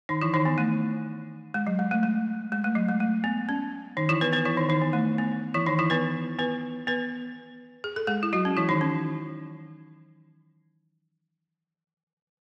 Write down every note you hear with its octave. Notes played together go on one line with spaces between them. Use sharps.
D#3 D#4
E3 E4
D#3 D#4
B3
A3
G#3
F#3
G#3
A3
G#3
G#3
A3
F#3
G#3
A3
B3
C#4
D#3 D#4
E3 E4
B3 B4
B3 B4
E3 E4
D#3 D#4
D#3 D#4
B3
A3
B3
E3 E4
D#3 D#4
E3 E4
B3 B4
B3 B4
B3 B4
G#4
A4
G#3 G#4
E4
F#3 F#4
C#4
E3 E4
D#3 D#4
C#4